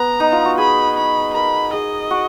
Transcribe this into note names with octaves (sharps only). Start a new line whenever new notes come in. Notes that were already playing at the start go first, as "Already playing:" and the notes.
Already playing: B3 A#5
D#4
F4
F#4
G#4 B5
B5
A#4 B5
G#4 D#5
F#4